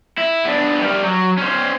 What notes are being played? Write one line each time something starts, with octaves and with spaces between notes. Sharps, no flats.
E4
B3 D4
G3 A#4
F#3
C#4 C5